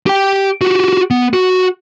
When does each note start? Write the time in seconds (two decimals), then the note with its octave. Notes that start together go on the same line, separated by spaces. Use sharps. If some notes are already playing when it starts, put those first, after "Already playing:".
0.06 G4 G5
0.61 F#4 G4
1.11 B3
1.33 F#4